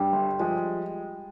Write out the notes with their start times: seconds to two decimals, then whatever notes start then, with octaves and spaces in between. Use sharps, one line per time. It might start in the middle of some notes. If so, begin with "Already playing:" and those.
Already playing: G2 G3
0.12 G1
0.39 F3 G#3